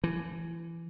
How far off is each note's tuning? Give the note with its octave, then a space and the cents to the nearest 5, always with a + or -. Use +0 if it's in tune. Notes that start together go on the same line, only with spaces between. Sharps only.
E3 +25